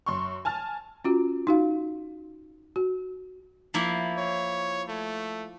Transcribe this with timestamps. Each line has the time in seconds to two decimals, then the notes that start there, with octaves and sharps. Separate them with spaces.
0.06 F#2 C6 C#6
0.45 G#5 A5 F6 A6
1.04 C#4 F4 F#4
1.47 D#4 F#4 F5
2.76 F#4
3.74 F3 A#3 E4
4.18 C#5
4.89 A3